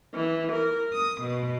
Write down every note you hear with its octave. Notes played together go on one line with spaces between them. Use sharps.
E3
A#4
D#6
B2